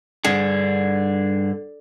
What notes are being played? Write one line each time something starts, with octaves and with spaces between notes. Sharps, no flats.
G2 D3 G#4